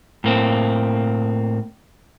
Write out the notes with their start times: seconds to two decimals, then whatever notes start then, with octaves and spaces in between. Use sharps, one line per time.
0.24 A2 A#3 C4